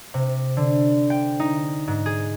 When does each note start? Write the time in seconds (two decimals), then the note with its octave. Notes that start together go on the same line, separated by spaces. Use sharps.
0.14 C3
0.57 D3
1.10 G5
1.40 D#4
1.88 G#2
2.06 G#4